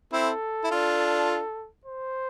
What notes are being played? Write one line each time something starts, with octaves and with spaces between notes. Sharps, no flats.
C4 E4 A4
E4
D4 F4
C5